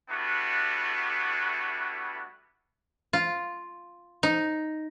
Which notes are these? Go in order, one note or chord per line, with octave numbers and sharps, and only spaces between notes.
G3 A3 B3 D4 E4 F#4
F4
D#4